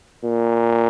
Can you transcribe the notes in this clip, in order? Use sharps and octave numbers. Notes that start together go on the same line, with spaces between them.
A#2